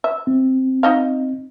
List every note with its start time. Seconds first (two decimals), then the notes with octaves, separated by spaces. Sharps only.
0.04 E5
0.27 C4
0.83 D#4 D#5 F5